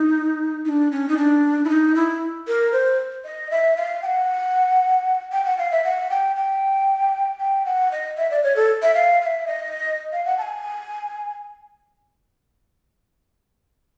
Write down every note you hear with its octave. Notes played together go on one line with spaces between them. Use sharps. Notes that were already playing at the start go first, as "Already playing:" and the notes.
Already playing: D#4
D#4
D4
C#4
D#4
D4
E4
D#4
E4
A#4
C5
D#5
E5
F5
G5
F#5
G5
F#5
F5
E5
F#5
G5
G5
G5
F#5
D#5
E5
D5
C#5
A4
E5
F5
F5
E5
D#5
F5
F#5
A5
G#5